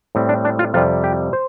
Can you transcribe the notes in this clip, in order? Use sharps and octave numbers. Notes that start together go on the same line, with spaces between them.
A2 G3 C4
D4
D4
F4
F2 C3 G3 F4
G4
C5